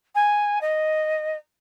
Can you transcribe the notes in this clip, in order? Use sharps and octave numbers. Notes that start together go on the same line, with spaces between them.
G#5
D#5